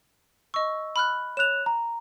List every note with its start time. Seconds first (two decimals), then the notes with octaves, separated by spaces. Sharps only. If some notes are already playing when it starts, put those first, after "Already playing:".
0.54 D#5 C#6 E6
0.96 B5 F6 F#6
1.37 C#5 F#6 E7 F7
1.66 A#5